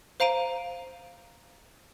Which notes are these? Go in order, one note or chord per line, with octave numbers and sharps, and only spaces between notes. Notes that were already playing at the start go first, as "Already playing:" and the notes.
C5 F5 A#5 D7 D#7